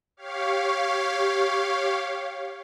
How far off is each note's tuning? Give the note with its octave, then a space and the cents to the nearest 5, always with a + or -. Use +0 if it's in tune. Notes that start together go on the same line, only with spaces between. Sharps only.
G4 +0 C#5 +0 F5 +0